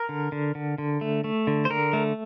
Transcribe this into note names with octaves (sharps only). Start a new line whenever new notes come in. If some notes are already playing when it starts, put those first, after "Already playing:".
Already playing: A#4
D3
D3
D3
D3
A3
A3
D3
C5
D3 A#4
A3